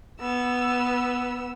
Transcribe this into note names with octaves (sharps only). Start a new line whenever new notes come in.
B3 E6